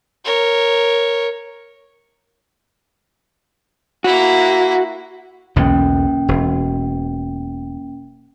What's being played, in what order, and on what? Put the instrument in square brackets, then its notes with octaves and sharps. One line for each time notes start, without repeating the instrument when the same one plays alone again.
[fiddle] A#4 C#5
[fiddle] A#3 E4 [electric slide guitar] F#4
[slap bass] B1 E2 D3 [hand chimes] A#3 C#4 G5
[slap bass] E1